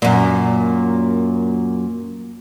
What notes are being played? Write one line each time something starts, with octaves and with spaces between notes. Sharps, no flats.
F#2 A#2